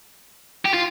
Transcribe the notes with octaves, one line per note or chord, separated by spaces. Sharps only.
G4
F4